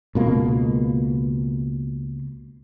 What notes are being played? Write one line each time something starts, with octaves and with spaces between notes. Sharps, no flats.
C#2 B2 A#3